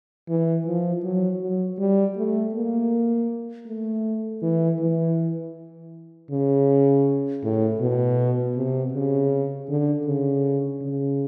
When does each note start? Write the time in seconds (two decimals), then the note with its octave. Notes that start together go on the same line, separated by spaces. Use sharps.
0.29 E3
0.66 F3
1.04 F#3
1.41 F#3
1.78 G3
2.17 A3
2.54 A#3
3.67 A3
4.42 E3
4.80 E3
6.31 C#3
7.43 A2
7.80 B2
8.56 C3
8.93 C#3
9.69 D3
10.07 C#3
10.81 C#3